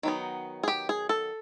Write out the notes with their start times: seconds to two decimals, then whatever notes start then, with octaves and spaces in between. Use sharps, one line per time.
0.03 D#3 F#3 B3 D#4
0.63 G#4
0.68 G4
0.89 G#4
1.09 A4